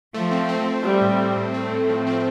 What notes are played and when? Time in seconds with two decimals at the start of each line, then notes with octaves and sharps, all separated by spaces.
0.14 F3 A3
0.31 C4
0.49 C4
0.66 A3
0.83 G3 A3
1.01 A2
1.19 A2
1.36 A2
1.54 A3 C4
1.71 A2
1.89 F3
2.07 C4